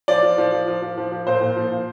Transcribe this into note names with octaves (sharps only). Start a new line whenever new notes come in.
F3 D5
F3
F3
F3
F3
F3
F3
F3
A#2 C5
A#2
F3
F3